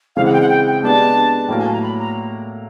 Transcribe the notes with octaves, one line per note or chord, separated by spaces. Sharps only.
C#3 E3 G#3 C4 E4 F5
F#5
G5
F#5
G5
G5
G#3 B3 D4 G4 A5
A2 F#3 A#3 G5
G#5
A5
A#5
B5
A#5